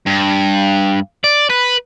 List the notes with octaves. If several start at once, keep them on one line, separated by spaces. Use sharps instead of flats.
G2
D5
B4